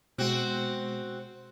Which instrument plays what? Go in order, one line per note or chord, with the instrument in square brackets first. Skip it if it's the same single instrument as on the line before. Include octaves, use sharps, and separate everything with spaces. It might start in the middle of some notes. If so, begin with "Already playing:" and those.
[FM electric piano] B2 G#3 [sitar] C4 F#4